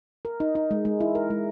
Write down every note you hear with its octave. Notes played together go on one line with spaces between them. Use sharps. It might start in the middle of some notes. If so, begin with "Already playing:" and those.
A#4
D#4
D#4
G#3
G#3
E4
A#4
G#3